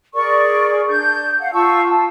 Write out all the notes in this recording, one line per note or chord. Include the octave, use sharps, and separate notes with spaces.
G#4 A#4 D5 C#6
D4 G6
F5 F#5
F4 A5 C#6 E6
A5